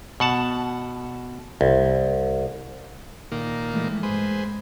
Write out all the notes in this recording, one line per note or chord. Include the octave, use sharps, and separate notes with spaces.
B2 F#5 A5
C2
A#2 D#3 A#3
E3 G#3 A3
G#2 G#4 B4 C5